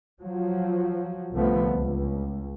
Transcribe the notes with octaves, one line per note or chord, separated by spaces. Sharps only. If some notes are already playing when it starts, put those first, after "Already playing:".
F3 F#3
C2 D3 F3 A3 B3
C#2